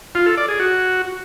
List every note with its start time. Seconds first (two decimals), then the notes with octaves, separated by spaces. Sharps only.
0.15 F4
0.26 A4
0.37 D5
0.49 G#4
0.60 F#4